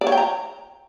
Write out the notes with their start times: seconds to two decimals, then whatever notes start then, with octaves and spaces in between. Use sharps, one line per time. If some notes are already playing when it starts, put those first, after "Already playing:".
0.01 D5
0.07 C#5
0.12 G5
0.17 A#5